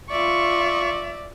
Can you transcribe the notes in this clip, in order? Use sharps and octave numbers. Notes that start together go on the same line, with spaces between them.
F4 D5 E5 C#6